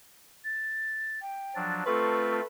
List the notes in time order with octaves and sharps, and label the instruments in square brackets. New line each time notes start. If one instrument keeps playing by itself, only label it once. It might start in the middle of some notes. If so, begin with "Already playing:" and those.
[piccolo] A6
[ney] G5
[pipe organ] F3 F#3 D4 [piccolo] A6
[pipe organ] A3 C4 F4 [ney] A4 [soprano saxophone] B4 [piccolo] C#6